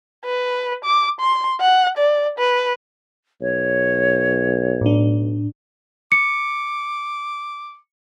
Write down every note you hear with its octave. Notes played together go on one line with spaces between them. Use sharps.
B4
D6
C6
F#5
D5
B4
B1 C#5
A2 D4
D6 C#7